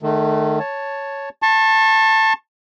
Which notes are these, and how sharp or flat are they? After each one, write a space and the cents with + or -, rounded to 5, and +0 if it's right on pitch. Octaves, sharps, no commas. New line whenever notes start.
D#3 -35 A3 -15
C#5 +0 A5 +0
A5 +10 C#6 -35